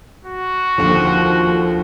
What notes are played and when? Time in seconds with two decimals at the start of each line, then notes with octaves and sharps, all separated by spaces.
0.25 F#4
0.78 D#2 D3 F3